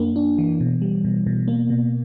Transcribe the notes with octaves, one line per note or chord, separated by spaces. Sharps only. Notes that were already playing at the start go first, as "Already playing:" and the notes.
Already playing: F#2 A#3 D4
D4
E3
B2
G3
B2
B2
A#3
B2